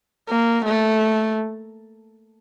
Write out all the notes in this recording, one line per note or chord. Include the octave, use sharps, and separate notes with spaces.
A#3
A3